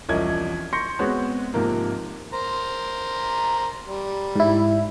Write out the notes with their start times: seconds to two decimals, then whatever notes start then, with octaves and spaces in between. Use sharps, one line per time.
0.09 E1 C2 F3 C#4 D#5 G#6
0.73 C6 C#6 G6 A#6 C#7
0.99 G#3 B3 C4 F#4 C5 C#5
1.54 G#2 C3 F3 A#3
2.33 A#4 C5 A#5
3.86 G3
4.36 G#2 E4